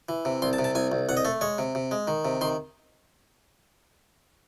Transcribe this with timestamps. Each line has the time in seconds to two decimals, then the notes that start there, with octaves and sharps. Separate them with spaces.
0.09 E3
0.25 C3
0.42 C2 C6
0.53 A5
0.59 C3
0.64 A5
0.75 C2 G#5
0.92 C2
1.09 C2 F#5
1.17 D#5
1.25 A3 A4
1.41 G#3 C#5
1.58 C3
1.75 C3
1.91 G#3
2.07 D#3
2.25 C3
2.41 D#3 C6